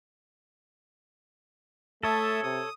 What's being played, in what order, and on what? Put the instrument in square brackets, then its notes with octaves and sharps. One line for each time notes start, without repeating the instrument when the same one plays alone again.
[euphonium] A3 [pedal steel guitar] A4 C#5 [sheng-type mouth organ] E5 A5 D#6
[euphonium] C3 [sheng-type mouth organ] D#6